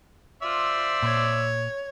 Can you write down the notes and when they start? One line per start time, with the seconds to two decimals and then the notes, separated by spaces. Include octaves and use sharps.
0.42 F4 C5 D5 E5
1.02 A#2 C#5